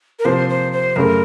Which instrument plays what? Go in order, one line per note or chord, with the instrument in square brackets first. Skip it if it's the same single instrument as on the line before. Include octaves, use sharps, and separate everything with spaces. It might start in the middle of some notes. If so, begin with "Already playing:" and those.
[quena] A#4
[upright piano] C3 F3 A#3 [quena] C5
[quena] C5
C5
[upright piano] F#2 C#3 A3 [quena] A#4